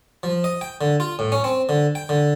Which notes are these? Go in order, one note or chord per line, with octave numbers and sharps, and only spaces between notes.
F3
D#5
G5
D3
F4
A2
C#4
C4
D3
G5
D3